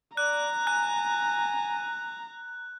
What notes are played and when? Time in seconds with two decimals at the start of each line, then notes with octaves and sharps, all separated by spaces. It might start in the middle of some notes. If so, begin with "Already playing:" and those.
0.17 D5 A#5 F#6
0.67 G#5 F#6